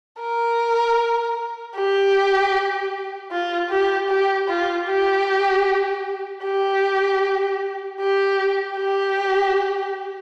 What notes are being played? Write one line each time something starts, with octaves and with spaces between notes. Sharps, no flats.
A#4
G4
F4
G4
G4
F4
G4
G4
G4
G4